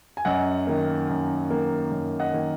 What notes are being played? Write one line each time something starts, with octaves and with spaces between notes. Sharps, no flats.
G#5
F#2 D#5 F#5
D#3 A#3
F#2
D#3 A#3
F#2
D#5 F#5
D#3 A#3